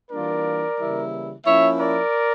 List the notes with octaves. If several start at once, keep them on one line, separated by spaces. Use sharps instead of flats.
E3 G3 A#3 D4 F4 A#4 D5
C#3 E3 G3 A#3 E4
F3 A#3 C#4 E4 C#5 E5
A#4 D5